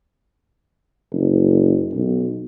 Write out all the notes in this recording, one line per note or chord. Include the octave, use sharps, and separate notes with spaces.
F#1
B1